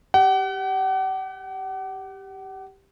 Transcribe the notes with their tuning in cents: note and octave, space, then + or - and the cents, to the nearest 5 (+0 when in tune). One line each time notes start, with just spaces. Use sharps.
G4 +0 F#5 +40